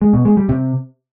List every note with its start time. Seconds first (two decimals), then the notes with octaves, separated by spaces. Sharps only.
0.02 G#3
0.13 B2
0.25 G#3
0.37 G3
0.49 C3